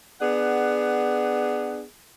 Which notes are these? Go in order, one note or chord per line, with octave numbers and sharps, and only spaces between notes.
B3 D4 G#4 F#5